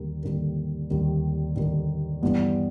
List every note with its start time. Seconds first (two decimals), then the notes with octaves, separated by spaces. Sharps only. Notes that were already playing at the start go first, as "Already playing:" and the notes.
Already playing: D#2 D3 G3 A#3
0.23 D#2 D3 G3 A#3
0.90 D#2 D3 G3 A#3
1.56 D#2 D3 G3 A#3
2.22 G2 E3 G3 B3 D4